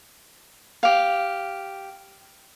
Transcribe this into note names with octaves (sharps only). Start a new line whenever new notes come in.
G4 F5